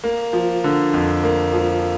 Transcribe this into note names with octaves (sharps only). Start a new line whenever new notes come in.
A#3
F3
D3
F2
A#3
F3